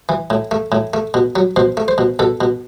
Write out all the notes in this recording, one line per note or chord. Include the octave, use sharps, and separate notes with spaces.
E3
A2
A3
A2
A3
B2
F#3
B2 C5
A3
C5
B2
B2 A4
B2